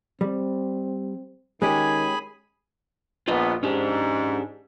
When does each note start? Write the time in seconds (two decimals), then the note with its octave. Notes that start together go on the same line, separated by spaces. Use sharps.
0.21 G3 C4
1.62 D#3 G#3 C#4 G4 G#4 G#5 B5
3.28 A#1 B3 F4 D#5
3.63 G#2 C#4 D4 G4